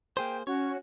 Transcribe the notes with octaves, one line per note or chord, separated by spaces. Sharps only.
A#3 G#4 C5 G5
C#4 F#4 C#5